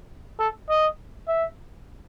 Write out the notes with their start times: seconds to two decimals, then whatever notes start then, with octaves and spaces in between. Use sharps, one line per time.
0.39 A4
0.69 D#5
1.28 E5